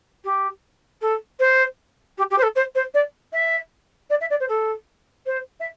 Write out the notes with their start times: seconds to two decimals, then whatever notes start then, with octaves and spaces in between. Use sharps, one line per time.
0.24 G4
1.01 A4
1.39 C5
2.18 G4
2.30 G4
2.38 C5
2.42 A4
2.55 C5
2.75 C5
2.94 D5
3.32 E5
4.10 D5
4.20 E5
4.30 D5
4.40 C5
4.48 A4
5.26 C5
5.60 E5